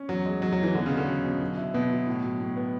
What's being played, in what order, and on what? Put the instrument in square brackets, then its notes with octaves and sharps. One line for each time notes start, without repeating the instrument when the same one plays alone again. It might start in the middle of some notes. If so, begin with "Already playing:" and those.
Already playing: [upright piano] C#4
[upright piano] E2 [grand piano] F#3
[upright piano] G#3
[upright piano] E2 [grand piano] F#3
[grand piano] F#3
[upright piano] E2 [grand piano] E3
[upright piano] B2 [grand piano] D3
[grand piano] C#3
[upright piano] C#4
[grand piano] D3
[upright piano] F#3
B2
F#3
E4
[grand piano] B2 [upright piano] B3
[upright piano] F#3
A2
F#3
A2
B3